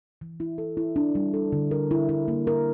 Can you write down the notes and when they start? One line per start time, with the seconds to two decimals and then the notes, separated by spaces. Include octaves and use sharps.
0.21 E3
0.40 E4
0.58 A4
0.77 E4
0.96 D4
1.15 G3
1.34 A4
1.52 D3
1.71 A#4
1.91 E4
2.09 E4
2.28 A#3
2.47 A#4